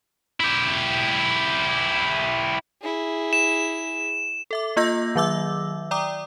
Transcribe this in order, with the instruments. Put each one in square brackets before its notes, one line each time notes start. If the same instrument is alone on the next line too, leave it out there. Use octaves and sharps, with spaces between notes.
[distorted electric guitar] E4 G4
[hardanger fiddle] E4 G#4
[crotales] E7
[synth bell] A4 E5 D6
A#3 F4 D#5 E6 G6 A#6
D#3 F#3 E5 D6 E6
D5 G5 A#5 D6 D#6